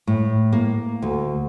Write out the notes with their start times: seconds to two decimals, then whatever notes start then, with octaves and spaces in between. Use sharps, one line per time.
0.07 A2
0.53 A#3
1.02 D2